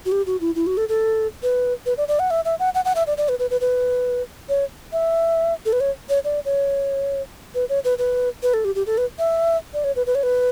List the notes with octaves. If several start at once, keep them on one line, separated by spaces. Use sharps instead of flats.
F#4
G4
F#4
E4
E4
F#4
A4
A4
B4
B4
D5
D5
F#5
E5
E5
F#5
F#5
F#5
E5
D5
D5
B4
B4
B4
B4
C#5
E5
A4
B4
C#5
C#5
D5
C#5
B4
C#5
B4
B4
B4
A4
G4
G4
A4
B4
E5
D5
C#5
B4
B4
C#5
B4